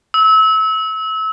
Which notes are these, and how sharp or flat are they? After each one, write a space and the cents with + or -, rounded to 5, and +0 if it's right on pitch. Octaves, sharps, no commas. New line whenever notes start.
E6 -30